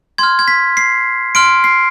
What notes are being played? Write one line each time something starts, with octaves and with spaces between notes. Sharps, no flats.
C6 F6 G#6
G#6
B6
C7
C6 F6 D7
C7